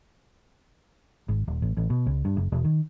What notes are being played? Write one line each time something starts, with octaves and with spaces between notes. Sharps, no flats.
G#1
D#1
A1
A1
B2
C#2
G2
F#1
E1
D#3